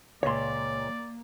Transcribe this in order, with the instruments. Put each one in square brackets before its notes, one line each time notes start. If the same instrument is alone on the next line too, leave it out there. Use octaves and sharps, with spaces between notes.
[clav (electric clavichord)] C#2 A#2 [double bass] A#3 [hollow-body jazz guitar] C#5 C6 [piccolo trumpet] D5